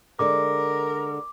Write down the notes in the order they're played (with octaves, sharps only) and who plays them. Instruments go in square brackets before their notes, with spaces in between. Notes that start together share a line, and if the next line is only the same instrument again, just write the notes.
[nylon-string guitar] D3 G#3 [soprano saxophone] A#4 [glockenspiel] D6